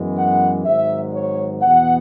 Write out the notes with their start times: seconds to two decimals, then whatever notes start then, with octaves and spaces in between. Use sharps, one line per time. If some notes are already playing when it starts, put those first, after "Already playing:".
Already playing: F#2 E3 G#3 B3
0.16 F#5
0.65 G#1 G#2 F#3 E5
1.13 C#5
1.62 E2 B2 B3 F#5